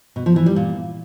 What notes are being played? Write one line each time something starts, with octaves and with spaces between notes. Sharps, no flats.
B2
F3
E3
G3
A#2